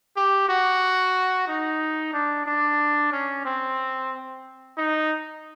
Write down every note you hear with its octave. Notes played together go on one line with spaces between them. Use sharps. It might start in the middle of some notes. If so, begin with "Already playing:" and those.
G4
F#4
D#4
D4
D4
C#4
C4
D#4